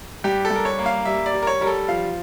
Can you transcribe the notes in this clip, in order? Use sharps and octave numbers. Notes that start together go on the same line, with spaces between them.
G2 G4
A4
G2
A#4
C#5
A#3
F5
G3 E5
D5
G3
A#4
C#5
G3 A#4
A4
F3 F5